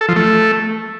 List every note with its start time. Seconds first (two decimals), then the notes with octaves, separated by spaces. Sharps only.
0.01 A4
0.08 F3
0.16 A3